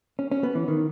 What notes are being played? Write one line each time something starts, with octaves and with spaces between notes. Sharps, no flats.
C#4
C#4
B3
E3
D#3